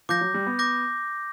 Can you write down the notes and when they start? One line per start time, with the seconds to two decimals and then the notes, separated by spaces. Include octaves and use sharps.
0.09 F3 D6 G6 A#6
0.21 F#3
0.34 G3
0.47 B3
0.59 D6 G6 A#6